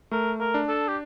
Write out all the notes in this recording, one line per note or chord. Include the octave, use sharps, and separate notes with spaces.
A3 A#4
A#4
D4
A4
G4